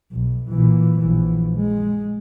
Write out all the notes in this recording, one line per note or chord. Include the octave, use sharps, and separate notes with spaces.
B1
A#2 E3
A#1 E3
G#3